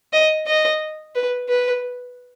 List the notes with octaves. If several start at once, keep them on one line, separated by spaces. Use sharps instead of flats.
D#5
D#5
B4
B4